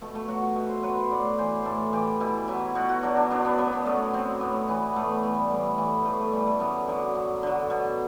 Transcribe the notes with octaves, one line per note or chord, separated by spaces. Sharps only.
B2 A3
A3
F#3 F#4
F#4
B2 E5
C5
F#3 B4
C5
A2 D5
E3 C5
A2 A4
E3 G4
B2 E4
F#3 E4
B2 F#4
F#4
F#3 D4
D4
F#2 D4
B3
F#3 B3
B3
F#2 A3
F#3 C4
A2 B3
E3 B3
A2 A3
B3
E3 B3
G3
A2 G3
E3 A3
A2 A3
A3
E3 G3
A3
F#2 B3
D3 F#3
F#2
D3 F#3
B2